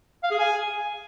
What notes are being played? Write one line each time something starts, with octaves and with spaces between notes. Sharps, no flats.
F5
G#4
G#5